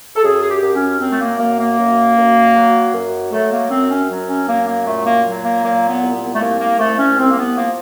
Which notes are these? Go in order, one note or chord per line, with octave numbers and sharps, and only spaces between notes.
A4
F#2 G#4
G#4
G4
F#2
C#4
F#2 C4
A3
A#3
F#2 A#3
A#3
F#2
F#2
F#3
F#2
F#3 A3
A#3
F#2 C4
C#4
F#3
C#4
F#2 A#3
A#3
A#2 A3
A#3
F#3
A#3
A#2 A#3
B3
C2
B3
A3
C2 A#3
A#3
C2 A3
C#4
C2 C4
A#3
B3
F3 A#3